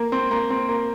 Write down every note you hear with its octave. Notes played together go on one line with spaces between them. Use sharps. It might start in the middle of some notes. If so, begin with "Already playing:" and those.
Already playing: A#3
C4
A#3
C4
A#3